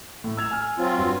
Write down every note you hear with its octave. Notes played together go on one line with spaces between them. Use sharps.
A2
E6 G#6 F7
G#5 F6
F#3 C4 F4
G2